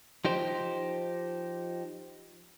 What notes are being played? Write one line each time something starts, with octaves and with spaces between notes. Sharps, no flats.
F3 D#4 G4 C5